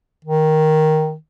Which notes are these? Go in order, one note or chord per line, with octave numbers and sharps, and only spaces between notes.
D#3